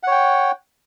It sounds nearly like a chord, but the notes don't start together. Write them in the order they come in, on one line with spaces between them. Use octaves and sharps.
F#5 C#5 G5